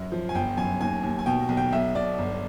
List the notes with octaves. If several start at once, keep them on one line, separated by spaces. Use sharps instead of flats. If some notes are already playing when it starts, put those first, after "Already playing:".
Already playing: F#2
F3
G#5
G1 G5
F#2 G#5
D#2 G#5
D#2
G#5
B2 G5
B1
G5
B1 E5
B1 D5
G1